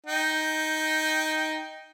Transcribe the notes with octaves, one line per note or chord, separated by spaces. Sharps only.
D#4 G5